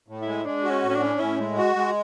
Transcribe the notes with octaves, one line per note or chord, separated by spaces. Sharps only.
A2
E4
G#3
G#3 D4
F#4
C#4
A2
C#4
D4
C#4
A2 E4
G#3
F#4
G#3